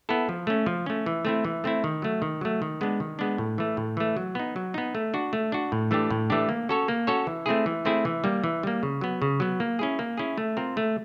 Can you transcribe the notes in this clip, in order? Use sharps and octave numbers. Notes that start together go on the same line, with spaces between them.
B3 E4 A4
F3
A3 C#4
F3
A3 C#4
E3
A3 C4 E4
E3
A3 C4 E4
D#3
F#3 A3
D#3
F#3 A3
D#3
G#3 B3 D4
D#3
G#3 B3 D4
A2
E3 A3
A2
E3 A3
F#3
B3 D#4
F#3
B3 D#4
A3
D4 F#4
A3
D4 F#4
A2
E3 A3 D4 G4
A2
E3 A3 D4 G4
A#3
C#4 F#4 A4 C#5
A#3
C#4 F#4 A4 C#5
E3
A3 C4 E4 G#4
E3
A3 C4 E4 G#4
E3
G3 A#3
E3
G3 A#3
C#3
F#3 B3
C#3
F#3 B3
A#3
C#4 E4 G#4
A#3
C#4 E4 G#4
A3
C4 F4 A#4
A3